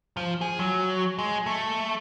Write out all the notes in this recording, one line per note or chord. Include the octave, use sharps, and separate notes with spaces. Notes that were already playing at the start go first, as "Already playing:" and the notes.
F3
G#4
F#3
G#3
A3